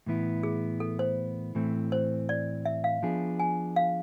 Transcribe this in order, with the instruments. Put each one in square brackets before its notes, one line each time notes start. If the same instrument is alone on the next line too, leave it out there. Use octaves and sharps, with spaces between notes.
[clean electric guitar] A2 E3 B3 E4
[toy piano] G#4
A4
C5
[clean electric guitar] A2 E3 A3 C4
[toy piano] C5
D5
E5
F5
[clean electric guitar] F3 B3 D4 G#4
[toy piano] G#5
F5